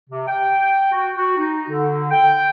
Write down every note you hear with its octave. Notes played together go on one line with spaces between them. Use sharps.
C3
G5
F#4
F#4
D#4
D3
G5